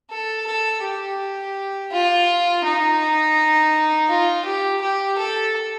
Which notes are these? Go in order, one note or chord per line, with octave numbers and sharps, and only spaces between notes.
A4
A4
G4
F4
D#4
F4
G4
G4
A4